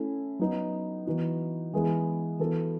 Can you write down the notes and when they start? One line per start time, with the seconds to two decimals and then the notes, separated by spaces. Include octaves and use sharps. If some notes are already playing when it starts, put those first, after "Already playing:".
Already playing: A3 C#4 E4 A4
0.39 F#3 B3 D#4
1.07 E3 B3 D#4 F#4
1.74 E3 G#3 B3 E4 G#4
2.39 E3 B3 F#4 A4